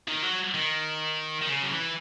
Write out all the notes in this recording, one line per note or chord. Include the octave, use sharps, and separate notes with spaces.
D#3
F#3
D#3
D#3
C#3
F#3
E3